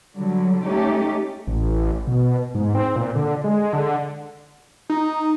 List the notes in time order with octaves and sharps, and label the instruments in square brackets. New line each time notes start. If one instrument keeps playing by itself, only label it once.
[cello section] D3 F#3 G3
A3 C#4 D#4 G4
[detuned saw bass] A1
B2
G#2
C4
A#2
D3
G#3
D3
[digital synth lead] D#4